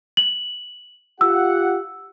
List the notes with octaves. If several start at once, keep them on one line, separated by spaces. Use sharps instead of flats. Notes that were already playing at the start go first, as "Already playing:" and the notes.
F#7
F4 G4 F#5 E6